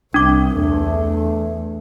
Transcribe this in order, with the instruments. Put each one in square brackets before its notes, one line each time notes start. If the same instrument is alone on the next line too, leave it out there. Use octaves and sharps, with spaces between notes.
[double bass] C2 [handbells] D4 D6
[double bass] E2 [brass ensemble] A3